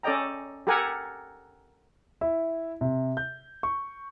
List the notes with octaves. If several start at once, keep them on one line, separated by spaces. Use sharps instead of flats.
C#4 A4 D5 D#5 G5 A#5
G4 A4 A#4 F#5 G#5
E4
C3
G6
C#6